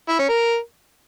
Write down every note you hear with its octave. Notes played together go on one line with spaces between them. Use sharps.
E4
C#4
A#4